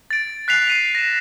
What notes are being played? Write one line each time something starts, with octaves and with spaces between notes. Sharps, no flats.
A6 D7
F#6 B6 C7 F7
C7 D#7 F7
A#6 E7